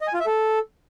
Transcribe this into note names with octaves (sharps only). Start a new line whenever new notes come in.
D#5
G#5
F4
E5
A4